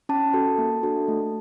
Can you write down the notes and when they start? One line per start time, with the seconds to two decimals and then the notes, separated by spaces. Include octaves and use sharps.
0.09 C#4 A5
0.33 F#4 A4
0.58 A#3
0.83 D4 F#4 A4
1.08 A3